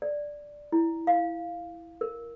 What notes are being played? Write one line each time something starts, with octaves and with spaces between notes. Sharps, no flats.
D5
E4
F5
A#4